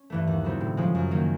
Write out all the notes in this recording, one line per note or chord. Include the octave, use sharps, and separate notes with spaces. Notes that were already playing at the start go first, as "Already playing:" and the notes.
Already playing: C#4
G2 E3 A3
D#2
C#3 F#3 A3 C4
A2
F3 G#3 C#4
F#2
D#3 F#3 A#3